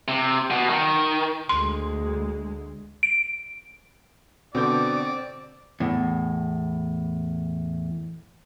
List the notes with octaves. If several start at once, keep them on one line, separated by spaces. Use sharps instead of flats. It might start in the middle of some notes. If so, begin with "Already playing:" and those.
C3
B2
D#3
D2 G#3 C6
D7
B2 D3 C4 D5 G6
E2 A2